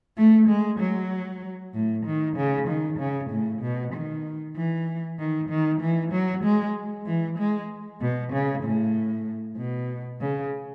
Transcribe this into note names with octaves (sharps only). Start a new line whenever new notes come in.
A3
G#3
F#3
A2
D#3
C#3
D#3
C#3
A2
B2
D#3
E3
D#3
D#3
E3
F#3
G#3
E3
G#3
B2
C#3
A2
B2
C#3